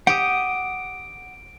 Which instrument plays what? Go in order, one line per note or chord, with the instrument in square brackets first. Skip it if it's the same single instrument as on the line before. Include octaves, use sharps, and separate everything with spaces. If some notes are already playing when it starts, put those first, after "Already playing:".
[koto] G4 [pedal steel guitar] F#5 D#6 [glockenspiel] D7